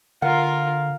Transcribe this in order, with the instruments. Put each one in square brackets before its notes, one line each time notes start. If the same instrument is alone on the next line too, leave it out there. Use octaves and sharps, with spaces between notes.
[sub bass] D3 [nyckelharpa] F4 A#4 [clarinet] F5 [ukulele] F#5